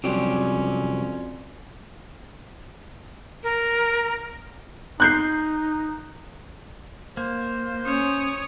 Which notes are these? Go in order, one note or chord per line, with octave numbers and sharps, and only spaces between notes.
C2 F2 F#3 C#4 F#4 G4 D5 C6
A#4
D#4 F#6 G6 C7
A#3 C5
C#4 C#5 D#6